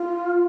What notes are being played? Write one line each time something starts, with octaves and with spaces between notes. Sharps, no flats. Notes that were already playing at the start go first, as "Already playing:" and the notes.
Already playing: F4